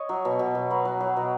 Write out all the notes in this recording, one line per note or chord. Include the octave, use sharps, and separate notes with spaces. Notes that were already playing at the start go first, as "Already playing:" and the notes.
Already playing: C#5 D#5
F#3
B2
B2
B2
F#3 B4
F#3
F#3
B2